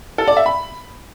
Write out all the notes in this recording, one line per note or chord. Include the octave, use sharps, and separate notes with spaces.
A4
D5
E5
B5